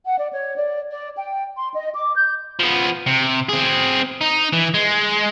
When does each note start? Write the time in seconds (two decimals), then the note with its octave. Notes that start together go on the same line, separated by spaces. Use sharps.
0.05 F#5
0.17 D5
0.32 C#5
0.56 D5
0.90 D5
1.16 G5
1.56 C6
1.73 D#5
1.94 D6
2.15 G6
2.59 F3 B3
3.07 C3
3.49 C4 G#4
4.21 D#4
4.53 E3
4.74 G#3